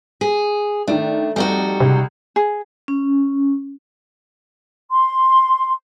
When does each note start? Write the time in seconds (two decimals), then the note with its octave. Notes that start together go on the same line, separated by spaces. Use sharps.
0.21 G#4
0.88 D#3 A3 D4
1.36 F2 G3 D#4 F#4
1.80 C#2 C3
2.36 G#4
2.88 C#4
4.90 C6